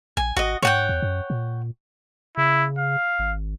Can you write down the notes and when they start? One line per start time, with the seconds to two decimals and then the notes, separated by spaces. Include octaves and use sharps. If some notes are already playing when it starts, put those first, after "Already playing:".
0.17 A#1 G#5
0.37 G#1 F#4 D#5
0.62 G#2 C#5 F#5 G5
0.89 E2
1.02 F#2
1.30 A#2
2.37 C#3 E4
2.78 F5
3.19 G#1